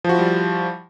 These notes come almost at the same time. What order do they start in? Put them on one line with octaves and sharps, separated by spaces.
F3 F#4 E4 G3